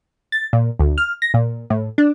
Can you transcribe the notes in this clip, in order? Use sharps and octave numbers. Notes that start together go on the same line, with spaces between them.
A6
A#2
D2
F6
A#6
A#2
A2
D4